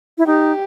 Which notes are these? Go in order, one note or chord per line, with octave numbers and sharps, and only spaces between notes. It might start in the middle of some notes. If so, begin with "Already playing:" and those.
E4
D#4 G4